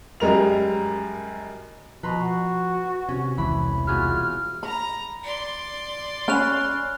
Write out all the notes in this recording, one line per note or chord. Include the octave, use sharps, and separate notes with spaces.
F#2 G3 G#3 A#4 F7
B2 F3 B4 A#5 C6
F#4
C3 C#4
E1 C2 E3 B5
B3 F4 F#4 G#4 F6
A#5 B5
D5 C6
C#4 G#5 B5 F6 F#6 F7